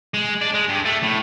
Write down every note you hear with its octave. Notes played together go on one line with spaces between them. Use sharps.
G#3
D4
G#3
G2
A3
A2